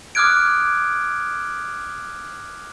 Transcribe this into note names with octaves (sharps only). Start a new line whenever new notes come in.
D6 D#6 F6 F#6 G#6 D7